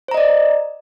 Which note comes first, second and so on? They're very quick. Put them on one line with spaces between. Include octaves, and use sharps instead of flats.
C5 A#5 D#5 D5